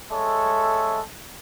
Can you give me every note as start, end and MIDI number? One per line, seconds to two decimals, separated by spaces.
0.11 1.01 56
0.11 1.01 69
0.11 1.01 73
0.11 1.01 76